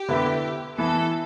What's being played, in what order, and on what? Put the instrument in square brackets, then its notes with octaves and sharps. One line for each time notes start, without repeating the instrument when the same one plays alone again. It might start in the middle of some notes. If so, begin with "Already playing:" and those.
Already playing: [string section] G4
[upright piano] D3 B3 E4 B4 E5
[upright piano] E3 B3 E4 [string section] A4